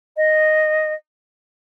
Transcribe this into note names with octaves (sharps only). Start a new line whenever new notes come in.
D#5